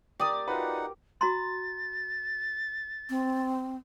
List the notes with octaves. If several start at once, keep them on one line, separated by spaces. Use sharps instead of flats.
G4 A#4 D5 D#6
D#4 F4 F#4 B4 F#5
F#4 A#5 C6 A6
C4